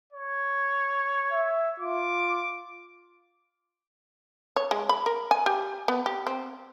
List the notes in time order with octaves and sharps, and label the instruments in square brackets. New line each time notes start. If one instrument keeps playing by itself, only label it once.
[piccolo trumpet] C#5
[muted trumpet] E5
[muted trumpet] F4 [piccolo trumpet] D6
[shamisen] C#5
G#3
B5
A#4
G#5
G4
B3
G4
C4